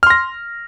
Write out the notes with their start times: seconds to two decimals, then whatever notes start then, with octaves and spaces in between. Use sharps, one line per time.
0.03 F6
0.07 C6
0.10 A#6